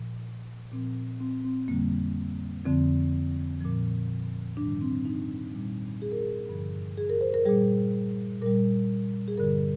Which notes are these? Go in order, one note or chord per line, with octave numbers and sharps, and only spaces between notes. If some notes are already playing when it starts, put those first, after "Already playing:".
Already playing: A#2 F3
A#2 F3 C4
C4
C4
F2 D3 G3 A#3
F2 D3 F3 C4
A#2 F3
G#2 D#3 G3 D4
C4
D#4
A#2 G3
G#4
A#4
G#4
G2 D3 F3
G#4
A#4
C5
A#4
A#2 G3 G#4
A#2 G3 A#4
G#4
G2 D3 G3 A#4